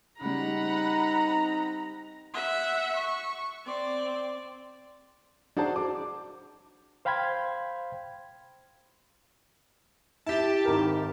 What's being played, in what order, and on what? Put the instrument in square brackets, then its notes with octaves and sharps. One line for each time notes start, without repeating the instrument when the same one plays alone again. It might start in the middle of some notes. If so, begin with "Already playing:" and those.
[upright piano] C#3 G3 [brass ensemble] C4 D#4 [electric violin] F#5 B5 [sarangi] A#5
[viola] E5 F#5
C#6
C4 D5
[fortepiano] D4 F#4 G#4 C5 A5
D6
[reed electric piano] C5 F5 G5 B5 C6 G#6
[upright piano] E4 B6 [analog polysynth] G4 A5
[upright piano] G#1 A#4